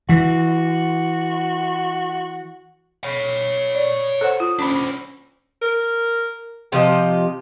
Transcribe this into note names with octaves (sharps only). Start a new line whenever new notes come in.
E3 F#4
C#5 B5
D5
A4 C5 F#5
F4
C#4 D4 C5 B5
A#4
C3 F3 G4 D#5